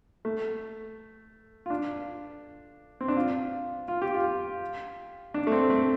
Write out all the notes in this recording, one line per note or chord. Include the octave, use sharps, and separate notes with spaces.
A3
F4
D4
C4
D4
F4
F4
G4
F4
D4
A3
C4
A3